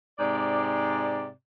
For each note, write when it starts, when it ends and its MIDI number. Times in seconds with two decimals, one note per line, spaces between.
0.19 1.29 44
0.19 1.29 48
0.19 1.29 74